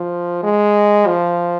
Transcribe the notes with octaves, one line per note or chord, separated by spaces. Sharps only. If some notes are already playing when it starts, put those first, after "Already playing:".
Already playing: F3
G#3
F3